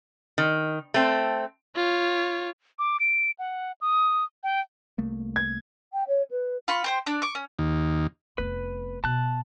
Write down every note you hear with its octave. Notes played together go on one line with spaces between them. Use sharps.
D#3
A3 C4
F4 C#5
D6
D7
F#5
D#6
G5
C2 A3 A#3
G#6
G5
C#5
B4
F4 B5 C#6
G4 C5 G5
D4 D5
C#6 D6
C#4
D#2
F1 B3 B4
B2 A5 F#6